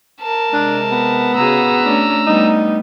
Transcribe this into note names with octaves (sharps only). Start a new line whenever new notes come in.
A#4 A5
C3 G#3 D4
B3
C#3 F#4 G#4 A#5 E6
A3 C#4 D4
G3 A3 B3 D#4